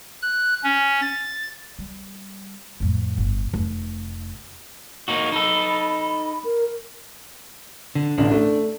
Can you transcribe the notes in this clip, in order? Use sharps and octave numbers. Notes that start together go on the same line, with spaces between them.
F#6
C#4
A6
G3
F2 A2
G1
F1
A#3 D#4 F#4
D#4 A4 B5
A#4
D3
A1 D3 D4
A3